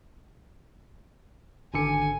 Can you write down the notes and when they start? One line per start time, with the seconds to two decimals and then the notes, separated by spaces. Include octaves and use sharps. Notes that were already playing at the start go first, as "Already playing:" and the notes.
1.74 G#1 D3 G#5 C#7